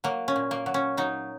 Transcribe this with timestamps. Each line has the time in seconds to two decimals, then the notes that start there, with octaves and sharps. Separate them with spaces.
0.04 F#3 A#3
0.28 C#4
0.36 A#2
0.51 A#3
0.66 F#3
0.74 C#4
0.97 F#3 D#4